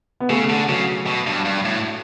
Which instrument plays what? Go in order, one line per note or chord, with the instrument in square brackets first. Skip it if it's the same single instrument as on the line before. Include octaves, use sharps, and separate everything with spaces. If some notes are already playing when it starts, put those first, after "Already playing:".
[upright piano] B3
[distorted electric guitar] C#3 [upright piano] A3
[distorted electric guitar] D3
[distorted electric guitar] C#3 [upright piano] F#3
[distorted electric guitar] B2
G2
G2
A2